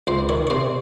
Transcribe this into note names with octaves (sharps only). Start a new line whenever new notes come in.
C#2 C5
D#3 C#5
C#5
C3 C5